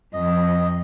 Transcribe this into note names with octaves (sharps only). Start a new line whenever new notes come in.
F2 D#5